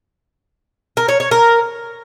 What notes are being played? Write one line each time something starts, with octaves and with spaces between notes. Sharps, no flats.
A#4
C#5
C#5
A#4